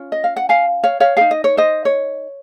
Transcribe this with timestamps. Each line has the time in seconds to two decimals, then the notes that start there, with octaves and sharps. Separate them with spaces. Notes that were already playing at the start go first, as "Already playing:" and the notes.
Already playing: C#4 F4
0.12 D#5
0.24 F5
0.36 F#5
0.49 F5 G#5
0.84 C#5 F5
1.00 C#5 F5
1.17 G#4 F5
1.21 D#4
1.31 D#5
1.44 C#5
1.57 C5 D#5
1.85 C#5